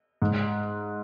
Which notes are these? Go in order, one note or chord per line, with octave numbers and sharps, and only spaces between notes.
G#2